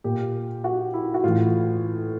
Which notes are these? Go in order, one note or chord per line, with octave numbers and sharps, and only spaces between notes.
A#2 G4
F#4
E4
F#4
A2 E3 F4